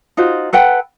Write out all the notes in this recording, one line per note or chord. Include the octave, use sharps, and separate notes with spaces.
D#4 F4 F#4 C5
A4 B4 F#5 G5